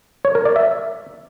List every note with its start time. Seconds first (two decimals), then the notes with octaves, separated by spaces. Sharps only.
0.25 C#5
0.35 A#4
0.45 D5
0.56 E5